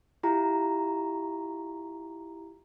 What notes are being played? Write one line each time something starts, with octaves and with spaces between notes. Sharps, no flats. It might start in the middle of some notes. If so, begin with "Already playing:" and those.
E4 F4 G4 A#5